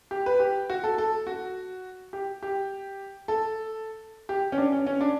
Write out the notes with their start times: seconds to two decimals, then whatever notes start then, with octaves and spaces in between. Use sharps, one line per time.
0.11 G4
0.26 B4
0.40 G4
0.70 F#4
0.84 A4
0.98 A4
1.27 F#4
2.13 G4
2.43 G4
3.28 A4
4.29 G4
4.52 C#4
4.58 D4
4.72 C#4
4.86 C#4
5.01 D4